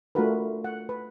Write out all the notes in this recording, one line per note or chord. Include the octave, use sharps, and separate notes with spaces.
A3 D4 F4 F#4 A#4 B4
F#5
B4